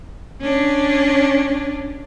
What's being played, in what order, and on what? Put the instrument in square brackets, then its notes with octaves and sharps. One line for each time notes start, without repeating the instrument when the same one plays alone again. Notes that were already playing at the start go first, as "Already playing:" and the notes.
[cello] C#4 D4